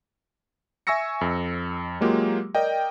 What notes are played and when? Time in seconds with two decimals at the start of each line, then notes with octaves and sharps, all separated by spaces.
0.87 E5 G#5 C#6 E6 A#6 C#7
1.21 F2
2.01 F#3 G#3 A#3 F4 G4
2.55 A#4 D5 D#5 G5